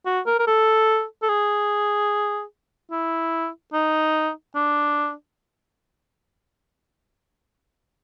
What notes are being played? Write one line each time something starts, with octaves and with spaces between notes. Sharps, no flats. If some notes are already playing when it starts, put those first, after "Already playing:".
F#4
A#4
A#4
A4
A4
G#4
E4
D#4
D4